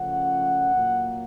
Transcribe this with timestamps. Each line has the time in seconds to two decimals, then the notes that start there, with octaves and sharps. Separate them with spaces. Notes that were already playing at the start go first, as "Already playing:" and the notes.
Already playing: C#3 F3 A3 C#4 F#5
0.73 A#2 F#3 A#3